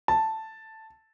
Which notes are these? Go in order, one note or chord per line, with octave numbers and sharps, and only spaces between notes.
A5